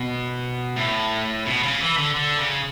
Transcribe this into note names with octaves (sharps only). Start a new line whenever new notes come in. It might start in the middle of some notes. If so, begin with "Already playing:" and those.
Already playing: B2
A2
B2
C#3
E3
D3
D3
C#3